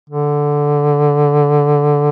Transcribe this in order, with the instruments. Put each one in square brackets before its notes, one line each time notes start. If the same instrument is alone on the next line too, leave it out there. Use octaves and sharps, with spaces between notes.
[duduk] D3